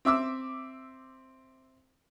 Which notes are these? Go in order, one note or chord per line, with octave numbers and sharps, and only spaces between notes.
C4 E5 D6 E6